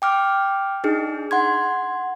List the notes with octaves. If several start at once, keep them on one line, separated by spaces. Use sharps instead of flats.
G5 D6 F6
D4 D#4 G#4
F#5 C6 G#6